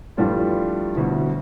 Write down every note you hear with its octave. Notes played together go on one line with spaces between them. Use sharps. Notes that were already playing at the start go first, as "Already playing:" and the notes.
G2 E3 F3 G3 A3 F4
A1 D2 B2